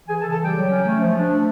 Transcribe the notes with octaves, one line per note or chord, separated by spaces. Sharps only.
E3 G#4 G#5
A4 A5
C#3
A4 A5
G3 G4 G5
F#3
C#4
A3
F3
D4
A3